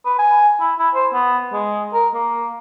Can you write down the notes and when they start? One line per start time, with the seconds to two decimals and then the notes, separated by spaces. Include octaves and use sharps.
0.05 B4
0.19 G#5
0.60 E4
0.79 E4
0.95 C5
1.14 B3
1.53 G#3
1.93 A#4
2.15 A#3